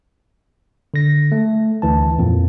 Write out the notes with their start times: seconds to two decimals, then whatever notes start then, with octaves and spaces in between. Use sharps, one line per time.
0.94 D3 A#6
1.32 A3
1.82 D2 E3 A5
2.19 F2 A#2